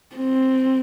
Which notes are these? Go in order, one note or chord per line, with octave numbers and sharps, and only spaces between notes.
C4